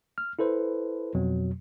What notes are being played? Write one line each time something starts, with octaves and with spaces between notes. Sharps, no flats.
F6
E4 A4 B4 C5
F2 B2 F#3